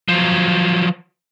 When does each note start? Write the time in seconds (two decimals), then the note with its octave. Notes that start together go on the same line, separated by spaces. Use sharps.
0.08 F3 F#3